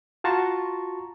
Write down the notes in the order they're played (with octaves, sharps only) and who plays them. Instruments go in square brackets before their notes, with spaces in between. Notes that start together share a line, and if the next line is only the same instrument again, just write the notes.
[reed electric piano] F4 F#4 A5 A#5 C6 C#6